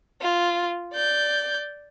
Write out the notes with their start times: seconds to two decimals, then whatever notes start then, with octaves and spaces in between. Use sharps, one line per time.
0.21 F4
0.94 D5 G6